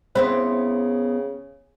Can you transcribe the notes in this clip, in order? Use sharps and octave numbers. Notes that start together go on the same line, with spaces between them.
C#3 B3 C4 E4 C5